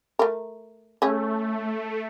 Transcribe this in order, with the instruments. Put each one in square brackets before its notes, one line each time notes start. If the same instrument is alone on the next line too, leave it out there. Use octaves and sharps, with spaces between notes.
[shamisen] A3 A#4
[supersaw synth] A3 [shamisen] C#4 G#4